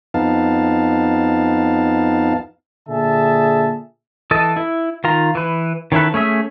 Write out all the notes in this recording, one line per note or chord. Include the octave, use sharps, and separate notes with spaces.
F2 B3 D#4 F5 A5
A#2 D3 G#4 E5 A5
E3 A4 D#5 A5
E4
D#3 F4 A#5
E3 B4
D#3 C#4 E4 A4 B4
A3 C#4 G#4 E5